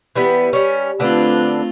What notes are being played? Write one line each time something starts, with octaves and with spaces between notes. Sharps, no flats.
E3 G3 B3
G3 C#4
D3 A3 C4 D4 F4 B4